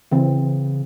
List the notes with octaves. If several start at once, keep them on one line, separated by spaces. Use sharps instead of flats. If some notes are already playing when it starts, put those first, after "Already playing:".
C#3 E3 C4